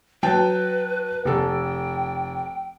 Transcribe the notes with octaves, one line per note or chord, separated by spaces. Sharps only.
F#3 B4 G5 A5
F1 A4 G5